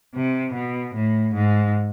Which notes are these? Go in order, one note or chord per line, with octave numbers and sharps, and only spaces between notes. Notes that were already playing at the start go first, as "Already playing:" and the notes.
C3
B2
A2
G#2